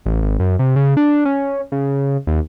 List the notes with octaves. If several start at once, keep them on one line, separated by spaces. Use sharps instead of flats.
A1
G#1
F#2
C3
C#3
D4
C#4
C#3
D#2